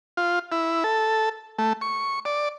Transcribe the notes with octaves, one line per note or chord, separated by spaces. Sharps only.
F4
E4
A4
A3
C#6
D5